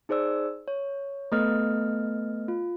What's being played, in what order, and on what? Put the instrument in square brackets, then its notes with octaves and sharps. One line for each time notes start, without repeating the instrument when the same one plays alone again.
[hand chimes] D#4 G#4 C5 D5 E6
C#5
A3 B3 A4 B4 D#5 F6
F4